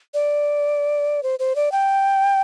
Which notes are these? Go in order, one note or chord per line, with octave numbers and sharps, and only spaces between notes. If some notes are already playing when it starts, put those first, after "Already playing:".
D5
C5
C5
D5
G5